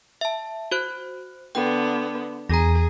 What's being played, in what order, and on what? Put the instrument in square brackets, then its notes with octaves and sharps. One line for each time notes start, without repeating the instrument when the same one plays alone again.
[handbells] E5 A5
F#4 C5 F#6
[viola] D3 B3 [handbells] G5
[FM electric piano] E2 [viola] G#4 [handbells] A#5 A#6